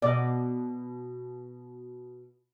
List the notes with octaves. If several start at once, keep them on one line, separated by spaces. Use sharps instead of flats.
B2 D5 D#5